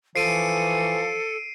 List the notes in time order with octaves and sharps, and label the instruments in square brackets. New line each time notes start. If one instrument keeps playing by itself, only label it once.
[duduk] E3 [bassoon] F3 [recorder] A4 [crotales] C7 D7 D#7